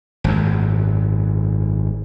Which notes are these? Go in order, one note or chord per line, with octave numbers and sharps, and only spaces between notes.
G#1 F#2